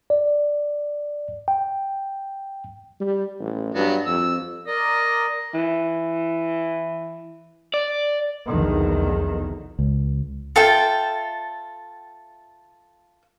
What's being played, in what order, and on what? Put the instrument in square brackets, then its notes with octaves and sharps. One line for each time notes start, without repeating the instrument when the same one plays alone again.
[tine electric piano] D5
G5
[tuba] G3
A1
[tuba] G2 [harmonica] F#3 B3
[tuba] F2 [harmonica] E6
[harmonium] A#4 D5 [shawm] D#5
[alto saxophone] E3
[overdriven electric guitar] D5
[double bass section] F1 B1 E2 D3 D#3
[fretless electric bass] C#2
[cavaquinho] F4 A4 E5 G5